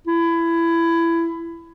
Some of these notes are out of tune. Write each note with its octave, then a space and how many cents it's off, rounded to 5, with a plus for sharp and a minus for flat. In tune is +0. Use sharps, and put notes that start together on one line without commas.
E4 +20